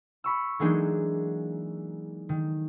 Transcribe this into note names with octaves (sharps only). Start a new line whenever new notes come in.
B5 C#6 E6
E3 F#3 G#3 A#3 D4 D#4
D#3